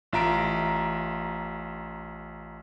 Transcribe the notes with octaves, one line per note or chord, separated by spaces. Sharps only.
A1 F4 E5 A#5 D7